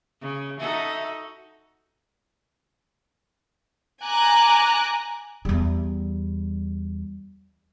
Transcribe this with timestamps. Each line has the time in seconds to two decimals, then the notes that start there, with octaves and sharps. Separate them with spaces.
0.21 C#3
0.59 D#4 F#4 A4 E5
4.03 G#5 A#5 D6 F#6
5.45 E2 G3